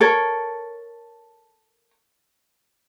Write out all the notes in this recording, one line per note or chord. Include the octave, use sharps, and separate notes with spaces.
A4 A#4 C#5